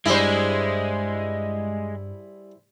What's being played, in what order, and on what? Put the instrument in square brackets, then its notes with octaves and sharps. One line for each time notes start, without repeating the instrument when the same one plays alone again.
[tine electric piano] G2 [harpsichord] G3 G#4 [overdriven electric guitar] G#3 [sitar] E4 C5